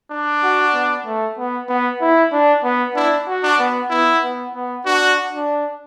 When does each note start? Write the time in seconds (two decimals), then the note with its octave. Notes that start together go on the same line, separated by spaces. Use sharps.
0.11 D4
0.43 F#4
0.74 B3
1.06 A3
1.38 B3
1.69 B3
2.01 E4
2.32 D4
2.64 B3
2.95 D4 E4
3.27 F#4
3.43 D4
3.59 B3
3.90 B3 E4
4.23 B3
4.54 B3
4.86 D4 F#4
5.33 D4